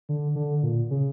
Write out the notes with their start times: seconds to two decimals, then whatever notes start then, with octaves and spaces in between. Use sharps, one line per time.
0.09 D3
0.35 D3
0.63 A#2
0.90 C#3